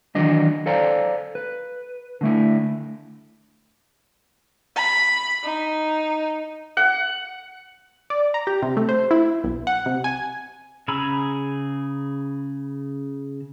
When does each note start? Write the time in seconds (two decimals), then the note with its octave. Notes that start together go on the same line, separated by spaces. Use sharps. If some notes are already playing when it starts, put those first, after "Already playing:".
0.15 D#3 E3 F#3 D4 D#5
0.66 A4 C5 D5 F5 A#5
1.35 B4
2.21 D3 A3 E4
4.76 B5
5.44 D#4
6.77 F#5
8.10 D5
8.34 A#5
8.47 G4
8.62 C3
8.77 A3
8.89 C5
9.11 E4
9.44 B1
9.67 F#5
9.86 C3
10.04 G#5
10.88 C#3 G#4 A#5 B5 E6